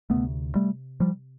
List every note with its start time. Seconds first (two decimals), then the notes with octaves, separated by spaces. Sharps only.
0.10 D2 C3 A3 B3
0.55 G3 A3
1.00 F3 G3